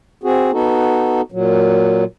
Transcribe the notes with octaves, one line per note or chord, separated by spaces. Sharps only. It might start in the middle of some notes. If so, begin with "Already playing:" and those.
C4 F#4 G#4
B3 D#4 F#4 A4
A#2 F#3